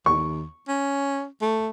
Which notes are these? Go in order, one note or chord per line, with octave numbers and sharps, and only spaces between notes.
D#2 C#6
C#4
A3